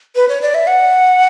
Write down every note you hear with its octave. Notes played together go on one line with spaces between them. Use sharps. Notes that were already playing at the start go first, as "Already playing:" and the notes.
B4
C#5
D5
E5
F#5